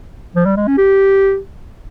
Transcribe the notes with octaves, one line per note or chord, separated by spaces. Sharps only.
F3
G3
G#3
C#4
G4